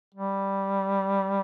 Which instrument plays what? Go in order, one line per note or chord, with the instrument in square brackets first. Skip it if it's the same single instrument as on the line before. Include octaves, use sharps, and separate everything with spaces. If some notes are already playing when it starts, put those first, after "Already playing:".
[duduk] G3